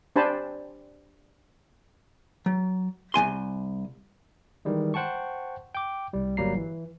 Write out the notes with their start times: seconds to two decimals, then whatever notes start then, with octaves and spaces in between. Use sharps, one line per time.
0.16 D4 G4 C5 G#5 A5 B5
2.46 F#3
3.14 C2 D#3 G#5 C6
4.65 D#3 E3 G3 G#3
4.94 C5 F#5 G5 A5 C#6
5.75 G5 D6
6.13 C2 G3
6.37 G1 F#3 G3 A#3 A#5 C7
6.57 E3